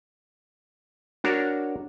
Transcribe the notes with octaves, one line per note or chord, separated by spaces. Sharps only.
D4 F#4 A#4 C#5